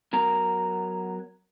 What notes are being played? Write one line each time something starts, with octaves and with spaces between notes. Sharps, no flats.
F#3 B3 A#4 A#5